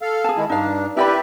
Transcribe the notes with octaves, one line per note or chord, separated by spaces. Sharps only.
A4 F5
G#4 A5
D#3 G#3 E4
G2 D4 D#4 F5
E4 G4 B4 D5 E5 B5